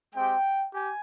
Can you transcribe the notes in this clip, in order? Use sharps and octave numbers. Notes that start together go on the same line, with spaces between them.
G#3 C4 G4 G5
G4 G#5